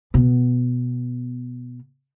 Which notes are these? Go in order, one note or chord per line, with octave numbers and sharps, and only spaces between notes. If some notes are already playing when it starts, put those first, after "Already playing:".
B2 B3